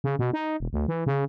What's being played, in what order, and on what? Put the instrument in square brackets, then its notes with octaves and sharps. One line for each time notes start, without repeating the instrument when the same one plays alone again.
[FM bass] C#3
B2
D#4
E1
D2
E3
C#3